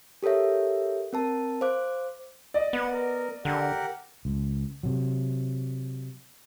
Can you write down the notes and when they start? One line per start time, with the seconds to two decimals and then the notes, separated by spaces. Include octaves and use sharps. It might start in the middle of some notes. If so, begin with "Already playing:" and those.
0.23 G4 A4 A#4 C#5 E5
1.13 C4 A#4 A5
1.61 C5 F5 D6 F#6
2.54 D5 D#5
2.73 B3 F#5
2.93 A#4
3.45 D3 G4 A#4 F#5
4.25 C#2
4.83 C3 F#3